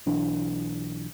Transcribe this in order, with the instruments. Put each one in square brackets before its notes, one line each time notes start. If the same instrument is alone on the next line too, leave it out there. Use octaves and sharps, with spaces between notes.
[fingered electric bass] B1 E3 D4